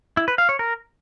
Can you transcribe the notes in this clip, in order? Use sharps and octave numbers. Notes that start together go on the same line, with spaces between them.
E4
B4
F5
C#5
A#4